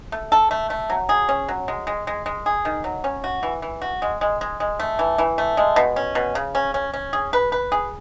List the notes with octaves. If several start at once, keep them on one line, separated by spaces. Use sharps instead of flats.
A3
A4
A3
A3
F#3
G#4
C#4
F#3
G#3
G#3
G#3
G#3
G#4
D#3
F#3
C#4
F#4
E3
E3
F#4
G#3
G#3
G#3
G#3
A3
E3
E3
A3
G#3
B2
C#4
B2
C#3
C#4
C#4
C#4
G#4
B4
B4
G#4